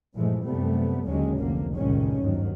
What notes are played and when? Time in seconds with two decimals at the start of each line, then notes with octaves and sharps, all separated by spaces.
0.14 G2 A#2 E3 F3 G#3 A3
0.43 F#2 C3 G3 A3 B3
1.06 D#2 D3 D#3 F#3 G#3 C#4
1.37 F1 C#2 D3 A#3
1.75 C#2 G2 A#2 D#3 G#3 C#4
2.20 G1 D#2 G#2 D#3 F#3